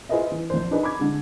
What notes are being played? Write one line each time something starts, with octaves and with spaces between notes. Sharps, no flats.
F4 G#4 B4 C5 D#5 E5
E3
A#1 C5
D4 D#4 G#4 B4
B5 D6 G#6
D3 G#3